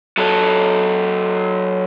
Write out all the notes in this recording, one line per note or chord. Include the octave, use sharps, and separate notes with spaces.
F#3 A4